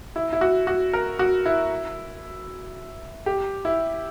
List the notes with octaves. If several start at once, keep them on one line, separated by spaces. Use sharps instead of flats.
E4
E4
F#4
F#4
A#4
F#4
E4
G4
E4